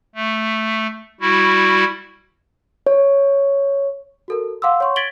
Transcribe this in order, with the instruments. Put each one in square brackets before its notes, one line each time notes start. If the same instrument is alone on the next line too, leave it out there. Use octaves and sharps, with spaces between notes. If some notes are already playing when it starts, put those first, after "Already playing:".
[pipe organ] A3
G3 E4 F#4
[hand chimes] C#5
[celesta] F#4 A4 A#4
F5 F#5 C6 D6 E6
C#5 F#5 C6 C#6
G#6 A6 B6 D7 F#7 G7